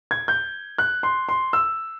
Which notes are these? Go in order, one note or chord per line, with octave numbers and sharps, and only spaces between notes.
G#6
G6
F#6
C6
C6
E6